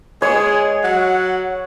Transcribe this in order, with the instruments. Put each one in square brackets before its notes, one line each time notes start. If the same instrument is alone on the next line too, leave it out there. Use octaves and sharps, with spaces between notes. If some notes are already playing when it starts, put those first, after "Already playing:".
[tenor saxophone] G#3 [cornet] G#4 [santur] C#5
[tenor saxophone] F#3 [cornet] F#5